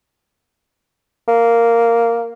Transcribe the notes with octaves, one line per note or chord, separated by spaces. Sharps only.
A#3